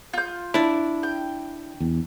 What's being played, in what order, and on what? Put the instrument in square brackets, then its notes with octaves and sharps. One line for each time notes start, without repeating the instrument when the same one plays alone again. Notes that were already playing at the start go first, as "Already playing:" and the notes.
[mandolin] F4 G6
[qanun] D4 D5 [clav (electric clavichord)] E4
[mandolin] G5
[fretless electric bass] E2